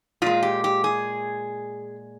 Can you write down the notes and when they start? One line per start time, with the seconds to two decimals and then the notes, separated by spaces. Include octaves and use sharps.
0.22 A#2 G#3 F4
0.43 G4
0.64 G4
0.84 G#4